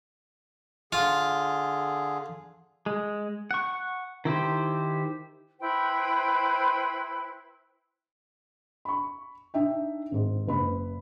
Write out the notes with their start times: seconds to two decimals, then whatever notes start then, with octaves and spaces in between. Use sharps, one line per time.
0.93 D3 F4 G#4
2.86 G#3
3.51 F#5 C#6
4.25 D#3 E4 G4 C5
5.60 E4 B4 C5 G5
8.85 B5 C#6
9.54 D4 D#4 E5 G5
10.11 G#1 G#2
10.47 F#1 B4 B5